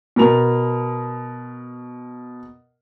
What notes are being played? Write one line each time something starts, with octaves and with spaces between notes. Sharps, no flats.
B2 A#4 F7